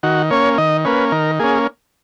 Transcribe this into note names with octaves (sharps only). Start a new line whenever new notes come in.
D#3 F#4
A#3 C#4 C#5
D#3 D#5
A#3 C#4 B4
D#3 A#4
A#3 C#4 G#4